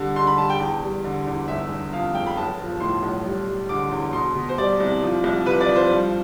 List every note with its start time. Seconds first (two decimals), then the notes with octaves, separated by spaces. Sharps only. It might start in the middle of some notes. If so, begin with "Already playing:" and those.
Already playing: D3 G3
0.16 D3 C6
0.27 B5
0.38 G3 A5
0.50 G5
0.60 E2
0.82 G3
1.04 D3
1.27 E2
1.48 G1 E5
1.70 G1
1.93 F2 F5
2.15 G1 G5
2.26 B5
2.37 B1 A5
2.59 F3
2.80 A2 C6
3.03 B1
3.25 G3
3.47 G3
3.69 D3 D6
3.91 E2
4.13 B2 C6
4.35 B2
4.49 C5
4.58 G3 D5
4.80 C2
5.02 F3
5.24 C2
5.46 C3 B4
5.61 D5
5.68 F3
5.76 C5
5.91 G2